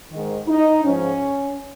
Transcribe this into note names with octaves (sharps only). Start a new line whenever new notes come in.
G#2 D#3
D#4
G#2 F3 C#4